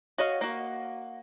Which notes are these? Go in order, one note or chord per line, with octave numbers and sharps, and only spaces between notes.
F#4 C#5 D#5 F5
A#3 F#4